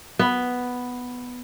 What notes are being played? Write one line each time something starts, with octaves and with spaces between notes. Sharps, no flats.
B3